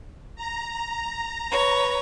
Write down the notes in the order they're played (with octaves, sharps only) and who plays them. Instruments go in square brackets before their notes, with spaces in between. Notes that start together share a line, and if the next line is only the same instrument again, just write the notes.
[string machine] A#5
[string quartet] B4 C#5